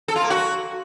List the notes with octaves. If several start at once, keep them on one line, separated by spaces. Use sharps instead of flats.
A4
F4
A#3
F#4